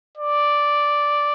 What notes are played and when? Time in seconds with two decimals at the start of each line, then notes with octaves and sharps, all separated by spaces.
0.18 D5